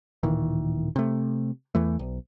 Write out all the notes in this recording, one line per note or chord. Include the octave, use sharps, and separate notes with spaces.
D1 A#2 D#3 E3
C3 A3
E2 E3 A3
B1